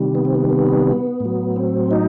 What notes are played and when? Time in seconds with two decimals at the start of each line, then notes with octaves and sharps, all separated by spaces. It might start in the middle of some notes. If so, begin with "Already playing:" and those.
Already playing: C3 D#3 G3
0.15 B3
0.25 C4
0.35 B3
0.50 B3
1.20 A2 F#3
1.56 C4
1.91 D#4